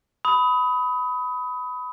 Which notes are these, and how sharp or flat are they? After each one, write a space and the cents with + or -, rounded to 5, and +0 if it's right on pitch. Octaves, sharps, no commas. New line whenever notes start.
B5 +15 D#6 +25